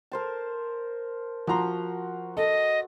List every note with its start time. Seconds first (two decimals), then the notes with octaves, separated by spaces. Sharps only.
0.12 A#4 C5 A5
1.47 F3 F#4 A#5 C6
2.37 A4 D#5